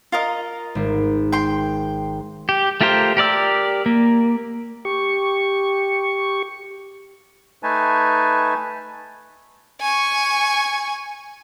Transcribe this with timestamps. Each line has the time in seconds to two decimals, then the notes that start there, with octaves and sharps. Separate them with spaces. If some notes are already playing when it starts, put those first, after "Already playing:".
0.12 F4 A#4 D#5
0.75 G#1
1.32 G5 C6
2.49 G4
2.81 A3 F4 G4 A#4 C5
3.17 G4 A#4 D5 E6
3.86 A#3
4.85 G4 C#6
7.63 A3 D#4 B4 G#5 A5
9.82 G#5 C#6